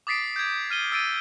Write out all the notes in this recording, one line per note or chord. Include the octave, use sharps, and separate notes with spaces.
D6 D#6 A6 B6 C7 D7
G6 G#6
F6 D#7 G7
E6 A6 D7 D#7